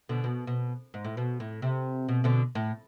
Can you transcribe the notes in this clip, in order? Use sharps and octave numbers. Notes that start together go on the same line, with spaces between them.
B2 D3
B2
B2
G#2
A2
B2
A2
C3
B2
B2 D3
A2